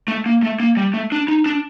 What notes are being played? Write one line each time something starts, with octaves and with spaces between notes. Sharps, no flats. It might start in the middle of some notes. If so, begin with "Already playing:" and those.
A3
A#3
A3
A#3
G3
A3
D4
D#4
D4